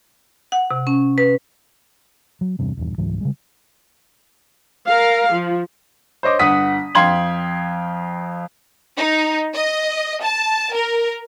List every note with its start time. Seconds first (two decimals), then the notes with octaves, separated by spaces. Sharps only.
0.52 F#5
0.71 C3
0.87 C#4
1.18 B4
2.41 F#3
2.59 E2 G2 C3
2.77 D#1 E2 G2
2.98 C#2 G#2 E3 F#3
3.21 C#3 G3 G#3
4.86 A#4 F5
5.31 F3
6.23 C5 C#5 D#5 D6
6.39 G1 D3 F#5 D#6 B6 D#7
6.95 F2 F5 G5 C6 G#6 F#7
8.97 D#4
9.53 D#5
10.21 A5
10.73 A#4